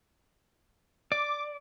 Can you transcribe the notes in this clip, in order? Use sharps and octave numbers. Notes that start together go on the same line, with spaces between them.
D5 D6